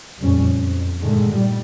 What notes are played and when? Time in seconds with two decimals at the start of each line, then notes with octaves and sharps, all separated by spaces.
0.19 F#1 F2 A#2 G3 C#4
0.52 F2
1.01 G2 A#2 D3 D#3 G#3 A3
1.32 A#2 G3